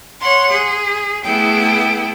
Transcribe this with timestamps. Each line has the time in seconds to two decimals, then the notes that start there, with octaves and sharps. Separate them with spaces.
0.21 C#5 F#5 C6
0.51 G#4
1.23 A3 B3 E4 G#4 G5